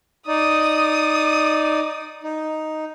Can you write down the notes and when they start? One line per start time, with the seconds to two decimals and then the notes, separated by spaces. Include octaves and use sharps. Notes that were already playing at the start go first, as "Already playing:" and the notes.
0.28 D#4 D5 D#6
2.23 D#4